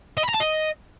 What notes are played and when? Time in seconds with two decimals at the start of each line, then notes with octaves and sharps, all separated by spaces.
0.17 D#5
0.23 B5
0.29 A#5
0.34 A5
0.40 D#5